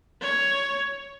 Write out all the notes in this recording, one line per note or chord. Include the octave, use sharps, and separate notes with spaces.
C#5